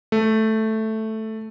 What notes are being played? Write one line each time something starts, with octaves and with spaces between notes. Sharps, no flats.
A3